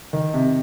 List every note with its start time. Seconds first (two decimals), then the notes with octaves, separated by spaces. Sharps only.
0.13 D#3
0.34 C3